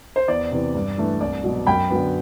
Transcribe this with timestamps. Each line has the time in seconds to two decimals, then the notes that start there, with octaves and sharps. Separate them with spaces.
0.16 C5
0.28 E2 D5
0.51 C3 E3
0.75 G2
0.98 E3 A3 D4
1.20 C2 D5
1.43 B2 F#3
1.67 F#2 G5 B5
1.90 D3 F#3 B3